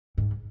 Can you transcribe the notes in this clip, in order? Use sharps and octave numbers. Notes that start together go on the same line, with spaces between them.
G#2